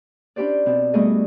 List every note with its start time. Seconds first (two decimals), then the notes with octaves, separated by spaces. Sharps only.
0.36 C#4 D4 E4 G4 C5 D5
0.66 B2 C4
0.93 G3 A3 B3 F#4 G#4 D#5